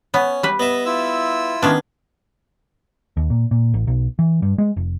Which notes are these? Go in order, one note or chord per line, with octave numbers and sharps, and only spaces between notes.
B3 C#4
G3 B4
B3 D#5 E5
E4 F4 E6
D#3 B3 C#4 D4
D#2
A#2
A#2
A1
B1
E3
G2
G#3
F1